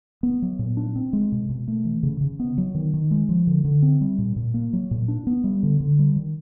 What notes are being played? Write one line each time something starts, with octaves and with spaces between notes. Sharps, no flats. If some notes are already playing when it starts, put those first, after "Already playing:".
B3
F#3
A#2
D4
C4
G#3
B2
B2
A3
E3
C#3
C#3
B3
F#3
D#3
D#3
G#3
F3
D3
D3
C4
G3
A#2
A#2
A#3
F#3
A#2
D4
B3
G3
D3
D3
G3
D#3